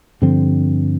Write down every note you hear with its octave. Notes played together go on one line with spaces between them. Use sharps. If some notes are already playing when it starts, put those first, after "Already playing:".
G2 D3 F3 C4